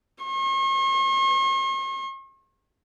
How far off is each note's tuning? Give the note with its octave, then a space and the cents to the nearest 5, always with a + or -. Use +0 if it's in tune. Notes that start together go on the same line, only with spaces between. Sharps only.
C#6 -45